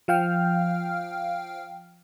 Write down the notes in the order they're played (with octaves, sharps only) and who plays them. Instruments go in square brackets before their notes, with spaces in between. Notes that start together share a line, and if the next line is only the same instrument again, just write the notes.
[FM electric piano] F3 F5 G5 F6